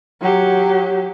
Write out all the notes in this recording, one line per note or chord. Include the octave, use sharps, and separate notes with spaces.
F#3 G4